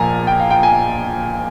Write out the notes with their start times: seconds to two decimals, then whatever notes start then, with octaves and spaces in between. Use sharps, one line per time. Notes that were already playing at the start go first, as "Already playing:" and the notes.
Already playing: A#1 A#2 F3 A#3 G#5 A#5
0.27 G5
0.40 F5
0.50 G5
0.63 G#5